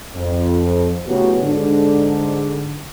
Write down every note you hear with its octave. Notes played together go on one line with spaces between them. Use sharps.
F2
A2 C#3 F#3 B3 F#4 G4
G#2 D3